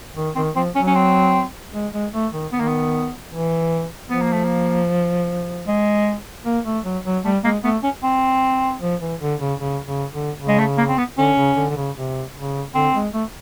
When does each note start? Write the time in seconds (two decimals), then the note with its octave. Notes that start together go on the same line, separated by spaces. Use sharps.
0.16 D#3
0.36 D#3 C4
0.55 F3 C4
0.75 F#3 C#4
0.87 C#4
0.95 C4
1.74 G#3
1.93 G#3
2.13 A3
2.33 D#3
2.53 D#3 B3
2.60 A#3
2.68 B3
3.31 E3
4.10 F3 B3
4.21 A#3
4.33 A3
4.44 A#3
5.67 G#3
6.45 A#3
6.66 A3
6.84 F#3
7.05 F#3
7.24 G3 A3
7.44 G#3 A#3
7.64 A3 B3
7.83 C#4
8.03 C4
8.82 F3
9.01 E3
9.21 D3
9.40 C#3
9.60 C#3
9.86 C#3
10.12 D3
10.39 C#3
10.48 G#3
10.59 A3
10.78 A#3
10.89 C4
10.98 B3
11.18 D3 C#4
11.37 C#3
11.56 D3
11.69 D3
11.77 C#3
11.96 C3
12.36 C#3
12.75 D3 C4
12.94 G#3
13.14 A3